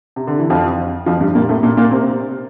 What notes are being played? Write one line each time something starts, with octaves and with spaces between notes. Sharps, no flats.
C3
D3
E3
F2 F3
F2 F3
G2 G3
A#2 A#3
A2 A3
A#2 A#3
A#2 A#3
C3 C4